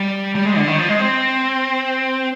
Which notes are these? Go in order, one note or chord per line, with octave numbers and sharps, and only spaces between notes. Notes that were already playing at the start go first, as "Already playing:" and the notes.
Already playing: G3
G3
G#3
D3
D#3
F3
G#3
C4